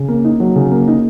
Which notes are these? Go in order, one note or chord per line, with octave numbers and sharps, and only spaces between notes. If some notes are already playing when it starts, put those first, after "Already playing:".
Already playing: C#3
A#3
D#4
F#3
C#3
A#3
D#4